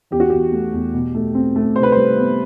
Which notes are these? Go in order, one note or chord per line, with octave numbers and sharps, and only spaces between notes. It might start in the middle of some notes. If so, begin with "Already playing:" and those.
E2 G4
F#4
E2 G4
A3
E2
B2
A3
C4
A3
C3 C5
B4
G3 C5
B3